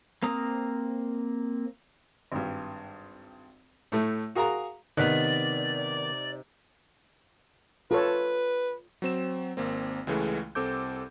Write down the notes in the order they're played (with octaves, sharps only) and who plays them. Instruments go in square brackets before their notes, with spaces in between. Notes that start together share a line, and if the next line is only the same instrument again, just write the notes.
[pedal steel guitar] A#3 C4 A#5 D#6
[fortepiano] G#1 G2
A2 A3
F#4 G#4 A#4 F5 A#5
[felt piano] C3 F#6 [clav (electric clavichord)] D#3 B3 [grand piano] D#4 B6 [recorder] D5
[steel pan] F4 A4 C#5 [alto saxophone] B4
[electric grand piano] F#3 C4 E7
G#1 A#3 C4
C#2 C#3 E3 G#3 A3
C2 C4 A4 D6 G6